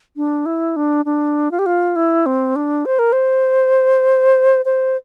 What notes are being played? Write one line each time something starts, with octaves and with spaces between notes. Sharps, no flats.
D4
E4
D4
D4
F4
G4
F4
E4
C4
D4
C5
A#4
C5
C5